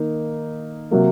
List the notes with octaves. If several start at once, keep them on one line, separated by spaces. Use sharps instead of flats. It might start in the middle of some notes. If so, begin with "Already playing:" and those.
Already playing: D#3 A#3 D#4
C3 F#3 A#3